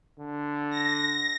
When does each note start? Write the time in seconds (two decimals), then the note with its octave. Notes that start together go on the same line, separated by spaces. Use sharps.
0.19 D3
0.70 A#6